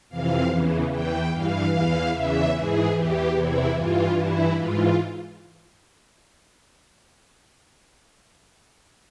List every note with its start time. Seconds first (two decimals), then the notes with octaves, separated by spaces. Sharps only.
0.09 F2 C3 E3 F5
0.50 E2 C#3 E3
0.90 E2 E3 G5
1.31 G2 E3 F5
1.71 E2 E3 F5
2.12 E2 C#3 E3 E5
2.53 G#2 E3 G#4
2.93 E2 E3 G4
3.33 E2 C3 E3 E4
3.74 G2 E3 F4
4.14 G2 E3 E4
4.55 G#2 E3 F4